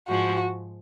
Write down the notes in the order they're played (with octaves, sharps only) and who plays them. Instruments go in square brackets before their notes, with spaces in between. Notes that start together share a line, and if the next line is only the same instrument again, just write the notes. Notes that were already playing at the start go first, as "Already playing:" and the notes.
[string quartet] G#2 F3 G#3 [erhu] F#4